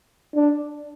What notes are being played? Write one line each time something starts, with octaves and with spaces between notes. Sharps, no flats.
D4